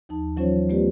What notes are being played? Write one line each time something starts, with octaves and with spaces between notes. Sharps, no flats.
D#2 F3 D#4 A5
E3 F#3 C#4 F4 C5 C#5
A3 B3 F4 G4 B4 D5